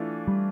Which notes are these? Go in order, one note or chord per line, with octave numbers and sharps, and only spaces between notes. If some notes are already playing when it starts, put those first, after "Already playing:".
Already playing: E3 A3 D4 F4
G3